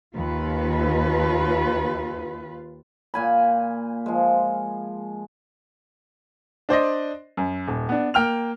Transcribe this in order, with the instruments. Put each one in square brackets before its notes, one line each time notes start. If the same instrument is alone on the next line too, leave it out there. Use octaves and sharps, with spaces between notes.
[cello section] D#2 F4 B4
[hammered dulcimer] A#2 G#5 B5
F3 G#3
[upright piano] D4 C5 D5 D#5
F#2
D#1
B3 D4
A#3 G5 F6 F7